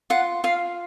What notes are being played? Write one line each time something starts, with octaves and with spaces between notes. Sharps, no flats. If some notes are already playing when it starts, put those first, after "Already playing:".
F4 F#5
F4 F5